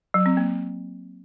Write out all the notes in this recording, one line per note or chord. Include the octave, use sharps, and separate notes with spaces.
F#3
C4
A#3